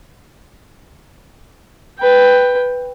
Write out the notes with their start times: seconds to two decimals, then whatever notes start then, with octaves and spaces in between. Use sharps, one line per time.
1.99 B4 G5